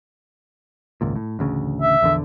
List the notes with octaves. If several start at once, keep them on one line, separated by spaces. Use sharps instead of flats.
G#1 C#2 A#2
A2
A1 D2 C#3
E5
A#1 E2 D3